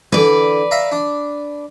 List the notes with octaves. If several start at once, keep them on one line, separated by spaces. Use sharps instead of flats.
D3 E3 B4 D5
E5 F5 A#5
D4